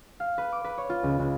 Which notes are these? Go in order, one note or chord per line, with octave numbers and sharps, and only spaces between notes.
F5
B4
D6
B4
C#5
F4
C#2
C#2